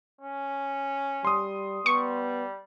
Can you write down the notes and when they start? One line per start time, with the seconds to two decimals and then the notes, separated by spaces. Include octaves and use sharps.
0.21 C#4
1.25 G3 C6 D#6
1.86 G3 B3 C#6